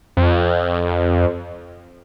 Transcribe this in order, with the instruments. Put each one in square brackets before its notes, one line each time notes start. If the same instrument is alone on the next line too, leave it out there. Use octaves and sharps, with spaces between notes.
[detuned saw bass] F2